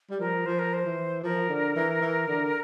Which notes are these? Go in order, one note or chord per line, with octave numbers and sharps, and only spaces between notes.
G3
F3 A#4
F3 C5
A#4
C5
E3
F3 A#4
D3
E3
E3
D3